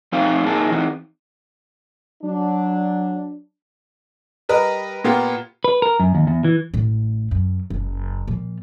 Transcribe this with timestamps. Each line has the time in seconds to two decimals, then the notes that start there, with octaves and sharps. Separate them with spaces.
0.12 F3 A3 C4 D#4 F5
0.46 A#2 D#4 G#4 A5
0.71 E3 C4 D#4
2.23 F#3 D4
4.49 G3 A#4 B4 D#5
5.04 A#2 A#3 B3 F4 G4
5.64 B4
5.82 A#4
6.00 F#2
6.15 D#2
6.27 E2
6.44 E3
6.74 A1 A2
7.31 F#2
7.70 F#1
8.28 A#2 F3